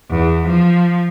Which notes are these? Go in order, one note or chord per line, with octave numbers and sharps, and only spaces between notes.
E2
F3